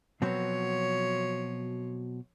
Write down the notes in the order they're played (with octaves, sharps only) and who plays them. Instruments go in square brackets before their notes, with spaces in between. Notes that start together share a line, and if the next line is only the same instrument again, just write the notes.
[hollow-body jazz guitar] B2 F#3 C4 [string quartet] F3 C#5